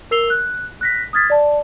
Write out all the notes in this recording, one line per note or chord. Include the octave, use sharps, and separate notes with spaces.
A#4 E6 C7 F7 G7
F#6
F#6 A#6 B6
D#6 F6 G#6 A6 B6
D5 A5